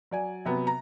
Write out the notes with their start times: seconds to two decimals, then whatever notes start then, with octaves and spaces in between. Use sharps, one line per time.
0.11 F#3 D5 G#5
0.45 C3 F#3 B3
0.67 A#5